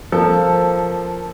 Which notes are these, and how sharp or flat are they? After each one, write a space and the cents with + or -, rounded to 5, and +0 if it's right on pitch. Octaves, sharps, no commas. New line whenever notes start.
F3 +0 A#3 +0 A4 +0